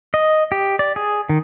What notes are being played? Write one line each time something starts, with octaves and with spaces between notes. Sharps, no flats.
D#5
G4
D5
G#4
D#3